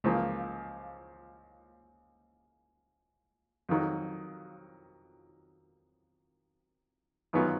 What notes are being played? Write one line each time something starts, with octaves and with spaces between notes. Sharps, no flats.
C#2 C#3 F3 A#3
F2 D#3 F#3
F#2 D#3 F#3 B3 F4